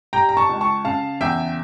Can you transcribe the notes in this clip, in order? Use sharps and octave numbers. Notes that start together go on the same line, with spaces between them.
G3 G5 A#5
A#5
A5 C#6
C#2
A5 C#6
C#3 F5 A5
E2 E5 G5